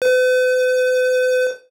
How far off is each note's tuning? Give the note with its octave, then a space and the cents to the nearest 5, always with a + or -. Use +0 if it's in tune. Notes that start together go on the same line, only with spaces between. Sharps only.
B4 +45